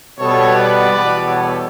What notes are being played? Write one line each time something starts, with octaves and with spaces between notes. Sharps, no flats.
B2 G3 B3 A4 C#5
B4 D5
E2 B2 G3 B3
A4 C#5